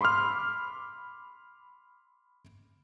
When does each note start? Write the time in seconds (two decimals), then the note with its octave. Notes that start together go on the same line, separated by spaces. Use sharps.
0.01 B5 C6 D6 E6 F6